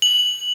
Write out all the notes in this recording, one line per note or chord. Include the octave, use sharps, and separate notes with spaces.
F#7